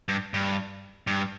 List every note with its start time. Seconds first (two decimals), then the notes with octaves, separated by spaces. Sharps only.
0.08 G2
0.34 G2
1.07 G2